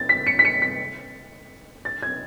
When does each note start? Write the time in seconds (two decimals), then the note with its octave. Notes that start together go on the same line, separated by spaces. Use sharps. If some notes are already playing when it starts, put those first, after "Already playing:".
Already playing: A6
0.09 B6
0.27 C#7
0.39 B6
0.45 C#7
0.62 B6
1.85 A6
2.02 G#6